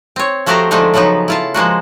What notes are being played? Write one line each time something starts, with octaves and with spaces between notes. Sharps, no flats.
C4 C#5
F3 A3 F#4 G4 C5 A#5
D3 F3 G#3 A3 D4 D#4
C#3 F3 F#3 B3 D#4
E4 F4 A5
F3 G#3 A#3 F#4